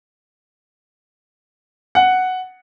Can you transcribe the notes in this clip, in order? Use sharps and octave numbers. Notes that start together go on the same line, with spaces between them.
F#5